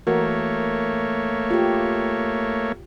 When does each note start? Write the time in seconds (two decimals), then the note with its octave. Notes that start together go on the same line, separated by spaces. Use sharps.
0.07 E3 A3 A#3 F#4 A#4 C#5
1.51 F4 G4